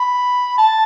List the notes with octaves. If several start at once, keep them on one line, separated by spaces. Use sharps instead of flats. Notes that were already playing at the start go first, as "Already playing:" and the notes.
Already playing: B5
A5